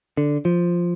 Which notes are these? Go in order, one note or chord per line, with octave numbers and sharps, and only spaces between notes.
D3
F3